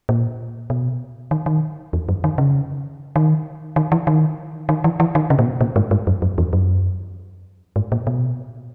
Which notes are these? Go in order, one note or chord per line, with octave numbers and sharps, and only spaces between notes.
A#2
B2
D#3
D#3
E2
F#2
D#3
C#3
D#3
D#3
E3
D#3
D#3
E3
E3
D#3
C#3
A#2
B2
A#2
G#2
G#2
F#2
F#2
E2
F#2
G#2
A#2
B2